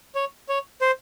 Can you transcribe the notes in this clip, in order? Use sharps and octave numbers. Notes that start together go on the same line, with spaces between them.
C#5
C#5
C5